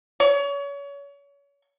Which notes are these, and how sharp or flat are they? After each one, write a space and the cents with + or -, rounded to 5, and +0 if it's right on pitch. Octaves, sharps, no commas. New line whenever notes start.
C#5 +30